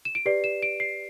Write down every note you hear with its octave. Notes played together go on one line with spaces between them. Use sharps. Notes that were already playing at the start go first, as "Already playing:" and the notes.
E7
D7
G4 B4 D5 C7
E7
D7
C7